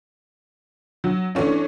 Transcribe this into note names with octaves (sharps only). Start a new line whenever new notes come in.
F#3
E3 A3 C#4 D4